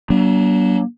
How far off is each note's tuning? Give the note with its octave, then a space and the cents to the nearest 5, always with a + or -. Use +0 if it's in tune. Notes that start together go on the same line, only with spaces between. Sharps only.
F#3 +35 A#3 +40 D4 -20